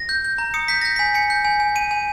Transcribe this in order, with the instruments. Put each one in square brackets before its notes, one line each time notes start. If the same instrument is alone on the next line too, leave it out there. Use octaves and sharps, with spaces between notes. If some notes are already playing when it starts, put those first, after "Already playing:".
Already playing: [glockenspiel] A#6
G6
G6
A#5
D#6 C#7
G6 B6
G6 A#6
G#5 B6
G#5 C#7
G6
G#5
G#5
G#5 D#7
G#5